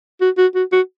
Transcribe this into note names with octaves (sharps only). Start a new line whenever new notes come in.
F#4
F#4
F#4
F#4